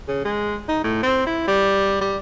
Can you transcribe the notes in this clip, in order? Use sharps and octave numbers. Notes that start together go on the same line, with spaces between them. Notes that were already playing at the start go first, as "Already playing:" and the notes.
C#3
G#3
D#4
A2
C4
E4
G3
G3